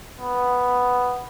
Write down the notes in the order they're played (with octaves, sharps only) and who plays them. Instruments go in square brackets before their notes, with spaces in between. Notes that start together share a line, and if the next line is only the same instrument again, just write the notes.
[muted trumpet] B3